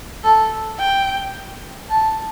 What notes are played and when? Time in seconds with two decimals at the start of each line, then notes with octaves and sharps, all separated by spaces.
0.24 A4
0.79 G5
1.89 A5